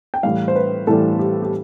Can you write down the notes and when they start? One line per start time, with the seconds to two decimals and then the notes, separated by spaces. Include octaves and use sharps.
0.14 G5
0.23 A2 E3 G3 F5
0.48 C5
0.55 B4
0.87 A2 E3 G3 A4
1.19 G4
1.42 G4